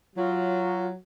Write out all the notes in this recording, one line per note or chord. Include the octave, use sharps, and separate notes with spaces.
F#3 F4